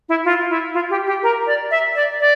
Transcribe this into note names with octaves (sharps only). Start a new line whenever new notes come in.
E4
F4
E4
F4
G4
G4
A#4
D5
E5
D5
D5